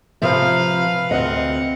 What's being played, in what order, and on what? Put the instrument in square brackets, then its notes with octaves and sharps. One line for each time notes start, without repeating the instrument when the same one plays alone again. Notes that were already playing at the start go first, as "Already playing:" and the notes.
[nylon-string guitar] C3 F3 E5 [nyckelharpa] B4 F5
[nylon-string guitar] D2 D#5 [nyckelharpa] C4 F#5